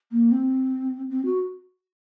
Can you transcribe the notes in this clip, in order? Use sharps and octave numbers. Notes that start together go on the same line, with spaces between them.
A#3
C4
C4
F#4